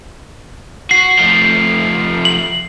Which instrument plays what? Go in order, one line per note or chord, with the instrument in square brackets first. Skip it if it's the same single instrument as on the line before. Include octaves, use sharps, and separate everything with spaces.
[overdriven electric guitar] F#4 [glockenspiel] C7
[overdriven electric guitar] F3 A3
[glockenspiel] F#7